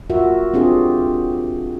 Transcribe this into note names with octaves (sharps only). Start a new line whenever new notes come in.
F4 F#4 A#4 E5
C4 D4 F4 G4 G#4